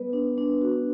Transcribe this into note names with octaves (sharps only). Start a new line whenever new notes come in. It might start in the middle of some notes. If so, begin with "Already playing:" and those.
Already playing: G3 B3 B4
D4
D4
F#4